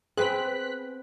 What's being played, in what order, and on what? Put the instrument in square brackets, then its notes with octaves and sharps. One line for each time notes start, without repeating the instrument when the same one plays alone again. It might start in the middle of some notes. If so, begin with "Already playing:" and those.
[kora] B3 C4 [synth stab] G#4 B4 [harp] C5 G5 [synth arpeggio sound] F#6 B6